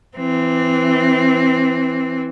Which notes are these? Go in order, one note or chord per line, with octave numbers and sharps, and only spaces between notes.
E3 C4